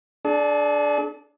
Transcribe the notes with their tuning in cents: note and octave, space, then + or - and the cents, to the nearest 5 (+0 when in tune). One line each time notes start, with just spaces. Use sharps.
D4 +0 G#4 +45